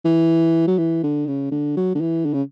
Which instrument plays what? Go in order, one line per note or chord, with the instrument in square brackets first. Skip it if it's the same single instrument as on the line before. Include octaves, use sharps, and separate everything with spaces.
[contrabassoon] E3
F#3
E3
D3
C#3
D3
F#3
D3
E3
D3
C#3